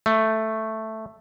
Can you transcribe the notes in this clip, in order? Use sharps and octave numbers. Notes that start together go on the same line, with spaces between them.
A3